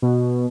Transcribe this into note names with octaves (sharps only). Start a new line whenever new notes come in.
B2